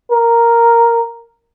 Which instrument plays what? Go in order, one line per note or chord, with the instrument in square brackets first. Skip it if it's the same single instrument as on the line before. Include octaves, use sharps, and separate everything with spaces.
[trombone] A#4